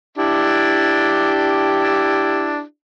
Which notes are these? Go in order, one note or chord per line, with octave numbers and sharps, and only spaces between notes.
D4 E4 G4